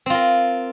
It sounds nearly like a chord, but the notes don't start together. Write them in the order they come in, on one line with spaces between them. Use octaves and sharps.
C4 F4 A#4